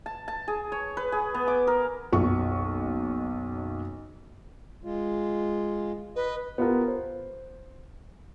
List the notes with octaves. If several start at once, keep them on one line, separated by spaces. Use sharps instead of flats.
A5
A5
G#4
C#5
B4
G#4
B3
D6
A#4
F#1 B1 C#6
G#3 F4
B4 D#5
B3 F4 G4 A#4
C5